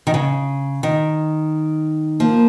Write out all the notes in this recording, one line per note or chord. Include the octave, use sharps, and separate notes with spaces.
D#3
C#3
D#3
F3 A#3